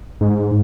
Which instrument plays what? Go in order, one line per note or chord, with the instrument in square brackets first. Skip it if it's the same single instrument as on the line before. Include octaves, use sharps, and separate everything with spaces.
[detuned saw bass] G#2